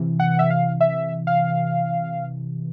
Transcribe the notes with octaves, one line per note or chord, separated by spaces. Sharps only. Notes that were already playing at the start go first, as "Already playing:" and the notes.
Already playing: C3 E3
F#5
E5
F5
E5
F5